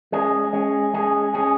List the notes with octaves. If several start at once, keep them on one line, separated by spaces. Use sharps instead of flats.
G#3 C#4 G#4
G#3 C#4 G#4
G#3 C#4 G#4
G#3 C#4 G#4